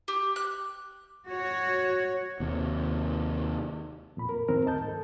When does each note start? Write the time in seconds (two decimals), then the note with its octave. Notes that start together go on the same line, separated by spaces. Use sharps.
0.08 G4
0.36 F#6
1.28 F#4 C#5
2.40 D#2 C3
4.17 F2 A#2 B5
4.29 A#4
4.48 F2 A2 D#3 C4 A#4
4.65 D2 D#5 A5 G6
4.84 G#2 A4